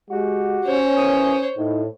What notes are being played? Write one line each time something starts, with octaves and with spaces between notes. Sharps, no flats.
G#3 F#4 G4
C#4 C5 C#5
D#2 E3 D#6
A2 D#4